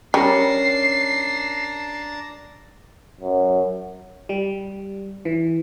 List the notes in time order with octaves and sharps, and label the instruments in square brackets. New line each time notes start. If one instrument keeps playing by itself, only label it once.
[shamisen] G3 [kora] C#4 A#4 [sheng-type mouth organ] D4 A5 A#5 [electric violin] C7
[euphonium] F#2
[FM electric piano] G3
E3